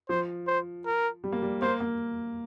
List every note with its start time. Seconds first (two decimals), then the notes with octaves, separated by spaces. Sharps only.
0.09 F3 C5
0.47 C5
0.86 A#4
1.24 G3
1.32 A#3
1.42 G3
1.62 A#3 C5
1.80 A#3